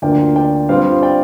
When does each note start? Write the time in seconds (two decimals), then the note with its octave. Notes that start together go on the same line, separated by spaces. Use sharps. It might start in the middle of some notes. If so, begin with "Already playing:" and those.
0.02 D2 D3 A#3 F4 D5 G5
0.36 D5 G5
0.69 G2 G3 C4 F4 C5 F5
1.03 D5 G5